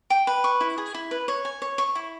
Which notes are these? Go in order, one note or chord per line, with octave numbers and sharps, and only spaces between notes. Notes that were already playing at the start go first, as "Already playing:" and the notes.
G5
B4
C#6
E4
G#4
E4
B4
C#5
G#5
C#5
C#6
E4